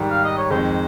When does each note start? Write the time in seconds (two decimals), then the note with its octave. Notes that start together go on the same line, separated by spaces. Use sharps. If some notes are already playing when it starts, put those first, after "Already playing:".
Already playing: G#2 D#3 G3
0.10 F5
0.24 D#5
0.37 C#5
0.51 F2 D#3 G#3 C5